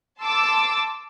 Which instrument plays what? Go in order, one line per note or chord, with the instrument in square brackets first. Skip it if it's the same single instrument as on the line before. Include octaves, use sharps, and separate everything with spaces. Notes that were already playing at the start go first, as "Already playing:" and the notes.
[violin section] A5 C6 D6 E6